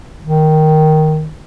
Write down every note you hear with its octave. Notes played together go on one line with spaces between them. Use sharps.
D#3